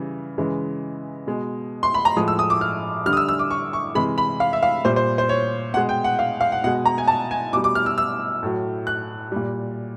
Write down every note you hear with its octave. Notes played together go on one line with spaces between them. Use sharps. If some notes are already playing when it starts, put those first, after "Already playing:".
Already playing: C#3 E3 G3
C#3 E3 G#3
B2 G#3
C6
B5
A#5
A2 F3 G#3 D#6
E6
D#6
D6
F6
D3 G3 F6
D#6
E6
E6
D6
C#6
C#6
C3 E3 G#3 B5
B5
F5
E5
F5
A#2 G3 C5
C5
C5
C#5
B2 G#3 F#5
G5
F#5
F5
F5
F#5
B2 G#3 F#5
A#5
G#5
A5
G#5
B2 G3 D6
D6
F6
E6
E6
A2 F#3
F#6
A#2 G3